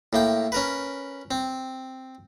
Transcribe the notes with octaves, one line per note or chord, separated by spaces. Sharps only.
A2 A#3 G5
C#4 A#4 B4
C4